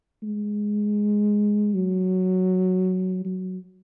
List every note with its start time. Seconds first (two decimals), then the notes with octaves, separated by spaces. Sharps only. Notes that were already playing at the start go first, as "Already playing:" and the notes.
0.23 G#3
1.74 F#3
3.25 F#3